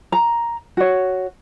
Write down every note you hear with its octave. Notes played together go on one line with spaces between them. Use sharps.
A#5
F#4 C#5